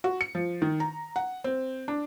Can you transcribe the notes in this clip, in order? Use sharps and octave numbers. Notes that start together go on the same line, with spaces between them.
F#4
C#7
F3
D#3
A#5
F#5
C4
D4